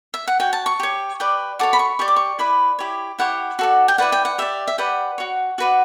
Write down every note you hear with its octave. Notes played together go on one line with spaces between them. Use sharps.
E5
F#5
F#4 C#5 G5
A5
C#6
G4 C#5
G4 B4 D5
F#4 A4 C#5 D6
B5
C#6
G4 D5 C#6
D6
C#6
E4 B4 D5 B5
E4 G4 C#5
E4 G4 C#5 F#5
F#4 A4 D5
G5
E4 B4 D5 F#5
G5
F#5
G4 D5 E5
E5
G4 B4 D5 F#5
F#4 C#5
F#4 B4 D5